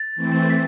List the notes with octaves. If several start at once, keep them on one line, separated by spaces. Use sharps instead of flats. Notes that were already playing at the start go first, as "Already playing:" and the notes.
Already playing: A6
E3 A3 C4
B6